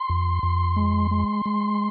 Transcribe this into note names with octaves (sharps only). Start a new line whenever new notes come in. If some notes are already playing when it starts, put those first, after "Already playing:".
Already playing: C6
F2
F2
G#3
G#3
G#3